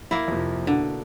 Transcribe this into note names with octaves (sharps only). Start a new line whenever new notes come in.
A#3 E4
F2 C3 F3
B2 D3